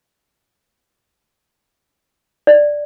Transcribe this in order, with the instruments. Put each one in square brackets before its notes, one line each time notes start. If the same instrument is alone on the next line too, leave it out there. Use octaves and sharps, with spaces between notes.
[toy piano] D5